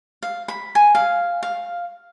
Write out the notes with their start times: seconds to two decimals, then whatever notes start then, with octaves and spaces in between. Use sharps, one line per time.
0.23 F5
0.48 B5
0.75 G#5
0.95 F5
1.43 F5